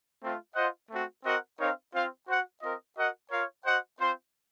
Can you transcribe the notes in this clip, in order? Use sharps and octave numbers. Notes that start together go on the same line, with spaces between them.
A3 C4 F4
F4 C5 D#5 F#5
A3 C4 F#4
C4 F#4 A#4 D#5 F#5
C4 D#4 A#4 C#5 F5
C4 F4 C5 F5
F#4 C5 F#5
C4 F4 A#4 D#5
F#4 A#4 D#5 F#5
F4 A#4 C#5 F5
F#4 C5 D#5 F#5
C4 F4 C5